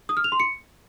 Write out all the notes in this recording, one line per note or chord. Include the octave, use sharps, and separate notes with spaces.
D#6
F6
F7
C6
C#7